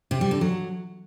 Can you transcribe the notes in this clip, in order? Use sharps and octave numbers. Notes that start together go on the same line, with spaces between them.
C3
G3
D3
F#3